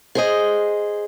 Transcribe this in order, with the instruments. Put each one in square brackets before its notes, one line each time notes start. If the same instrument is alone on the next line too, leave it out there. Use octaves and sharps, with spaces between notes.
[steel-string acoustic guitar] G#4 C5 D#5